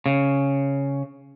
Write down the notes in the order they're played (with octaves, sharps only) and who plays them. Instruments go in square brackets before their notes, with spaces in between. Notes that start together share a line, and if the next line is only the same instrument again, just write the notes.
[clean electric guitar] C#3